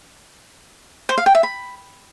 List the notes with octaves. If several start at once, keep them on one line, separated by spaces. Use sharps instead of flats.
C5
F5
G5
E5
B5